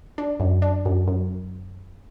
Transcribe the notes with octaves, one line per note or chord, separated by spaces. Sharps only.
D4
F#2
D4
F#2
F#2